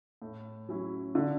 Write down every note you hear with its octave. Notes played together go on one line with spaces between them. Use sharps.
A2
F#3 C#4 E4
D3